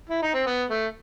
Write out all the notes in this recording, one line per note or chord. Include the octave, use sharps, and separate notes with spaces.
E4
D#4
C4
B3
A3